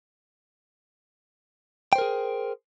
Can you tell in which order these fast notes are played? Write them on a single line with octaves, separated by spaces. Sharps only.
G5 C5 A#4 G#4